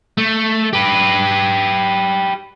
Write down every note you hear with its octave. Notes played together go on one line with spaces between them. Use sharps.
A3
G4 B4